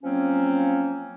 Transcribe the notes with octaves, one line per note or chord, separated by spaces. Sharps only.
F3 F#3 A#3 C4 C#4